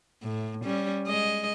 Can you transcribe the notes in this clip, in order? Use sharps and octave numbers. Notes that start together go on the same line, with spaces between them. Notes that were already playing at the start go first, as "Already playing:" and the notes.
A2
G3 C#4
G#3 D#5